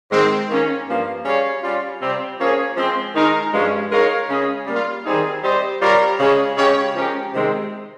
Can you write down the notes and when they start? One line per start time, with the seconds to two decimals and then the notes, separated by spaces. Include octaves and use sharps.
0.11 G#2 D#3 G#3 C4
0.49 D#3 A#3 C#4
0.88 G2 F3 A#3
1.25 G3 C#4 G#4 C#5 F5
1.63 G3 C#4 F4
2.02 C3 G3 C4
2.40 F3 A#3 C#4 G#4 C#5
2.77 F3 G#3 C4
3.15 D#3 G#3 D#4 A#4
3.53 G2 F3 G#3 C#4
3.91 G#3 D#4 A#4 C#5 F5
4.29 C#3 G#3 C#4 G#4 D#5
4.67 G3 A#3 F4
5.05 D#3 G3 C4 D#4 G#4
5.43 G3 C4 G4 C5 D#5
5.81 G3 C4 F4 A#4 C#5
6.20 C#3 G#3 C#4 G#4 C#5
6.57 C#3 G#3 C#4 G4 C#5
6.95 F3 G#3 C#4 G4 A#4
7.33 C3 D#3 G#3 C4